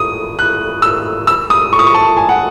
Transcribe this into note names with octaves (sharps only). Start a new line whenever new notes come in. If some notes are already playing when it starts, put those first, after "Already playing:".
Already playing: D#6
F#6
E6
E6
D#6
C#6
D#6
C#6
A5
G#5
F#5